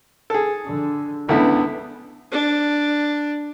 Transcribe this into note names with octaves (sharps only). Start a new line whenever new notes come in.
G#4 A4
D3
C#2 D3 B3 D4 E4
D4